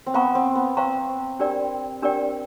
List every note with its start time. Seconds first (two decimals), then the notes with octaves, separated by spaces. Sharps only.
0.06 C4
0.14 B3 C5 F5 A#5 C#6
0.35 C4
0.55 B3
0.77 C4 C5 F5 A#5 C#6
1.39 D4 G4 A#4 D5 G5
2.02 D4 G4 A#4 D5 G5